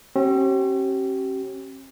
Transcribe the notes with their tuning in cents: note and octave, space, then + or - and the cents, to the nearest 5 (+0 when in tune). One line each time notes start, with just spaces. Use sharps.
C#4 -45 G4 -40